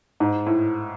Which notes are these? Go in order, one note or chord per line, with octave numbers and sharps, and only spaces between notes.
G#2
A2